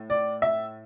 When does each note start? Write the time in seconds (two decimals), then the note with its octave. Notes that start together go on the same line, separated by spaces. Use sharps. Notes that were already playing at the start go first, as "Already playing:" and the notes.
Already playing: A2
0.10 D5
0.42 E5